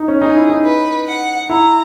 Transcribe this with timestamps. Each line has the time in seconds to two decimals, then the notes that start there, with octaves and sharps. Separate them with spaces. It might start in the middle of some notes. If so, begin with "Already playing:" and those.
Already playing: D#4
0.08 C#4
0.22 D#4 G#4
0.36 E4
0.50 D#4
0.65 B4
1.07 F#5
1.50 E4 A#5